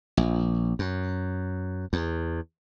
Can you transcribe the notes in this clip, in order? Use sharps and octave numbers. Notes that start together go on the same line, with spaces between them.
A#1
F#2
E2